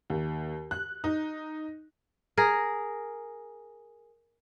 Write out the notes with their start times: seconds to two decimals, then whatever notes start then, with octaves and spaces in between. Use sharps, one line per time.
0.10 D#2
0.71 F#6
1.04 D#4
2.37 G#4 A#4